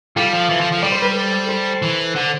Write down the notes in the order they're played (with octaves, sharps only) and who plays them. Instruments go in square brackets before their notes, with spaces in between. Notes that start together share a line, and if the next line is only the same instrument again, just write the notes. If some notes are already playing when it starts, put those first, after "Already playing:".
[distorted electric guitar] G3 [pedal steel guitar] F4 A4
[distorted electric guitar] F3
E3
F3
F3
[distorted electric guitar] G3 [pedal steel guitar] D5
[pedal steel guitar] C5
B4
A4 C5
A4 C5
[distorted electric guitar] E3
D3